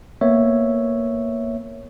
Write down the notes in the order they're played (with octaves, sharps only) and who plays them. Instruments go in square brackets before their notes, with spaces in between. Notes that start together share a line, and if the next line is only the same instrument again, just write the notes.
[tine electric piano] A#3 B3 C#5 E5